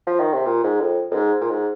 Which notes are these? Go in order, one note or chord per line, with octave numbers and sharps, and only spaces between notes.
F3
D#3
C3
A#2
G#2
F2
F2
G#2
A#2
G#2